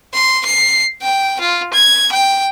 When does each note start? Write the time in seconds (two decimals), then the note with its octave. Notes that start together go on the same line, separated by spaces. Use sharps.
0.14 C6
0.46 C7
1.02 G5
1.40 F4
1.73 G#6
2.12 G5